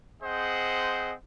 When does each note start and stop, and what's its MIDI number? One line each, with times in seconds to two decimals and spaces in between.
0.23 1.13 60
0.23 1.13 68
0.23 1.13 72
0.23 1.13 75
0.23 1.13 78